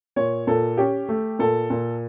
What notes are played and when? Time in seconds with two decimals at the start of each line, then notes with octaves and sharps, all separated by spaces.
0.16 A#2 C#5
0.47 A#2 A4
0.77 C#4 G4
1.09 A3
1.39 A#2 A4
1.70 A#2